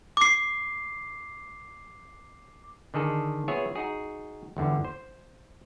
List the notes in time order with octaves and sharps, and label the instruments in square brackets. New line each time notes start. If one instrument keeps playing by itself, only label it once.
[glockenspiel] D6 C7
[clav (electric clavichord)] D3 D#3 G#4 A4
B3 F4 G#4 C#5 E5 G#5
D#4 F#4 G#4
G1 E2 D3
C5